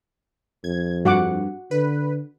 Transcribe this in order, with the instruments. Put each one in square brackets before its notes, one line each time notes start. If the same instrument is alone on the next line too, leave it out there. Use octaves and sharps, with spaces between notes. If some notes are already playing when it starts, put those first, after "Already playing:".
[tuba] F2 [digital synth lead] G#6
[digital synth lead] G2 [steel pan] F#4 F#5 D6
[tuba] D3 [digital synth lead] B4